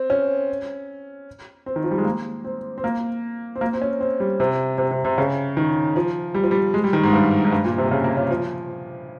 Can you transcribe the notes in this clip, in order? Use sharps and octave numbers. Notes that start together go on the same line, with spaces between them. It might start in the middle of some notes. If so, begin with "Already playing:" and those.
Already playing: C4
C#4
C4
D#3
F3
G3
G#3
A#3
C4
C4
A#3
C4
A#3
C4
C#4
C4
G3
C3
C3
C3
C3
C#3
D#3
F3
G3
F3
G3
G#3
G3
D#3
G#2
G2
G#2
G2
A#2
C3
C#3
A#3
C#4
F3